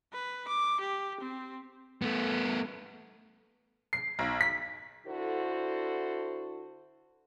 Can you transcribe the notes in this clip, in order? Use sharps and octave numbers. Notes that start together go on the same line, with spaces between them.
B4
D6
G4
C4
A3 B3
C7
B1
B6
D3 E4 F#4 A4 C5